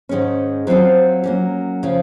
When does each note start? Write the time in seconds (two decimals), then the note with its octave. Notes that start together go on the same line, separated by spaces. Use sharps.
0.09 G#2 D#3 G#3 C#4
0.67 F#3 C4 F4 C5
1.24 F#3 A#3 C#4
1.83 C#3 F3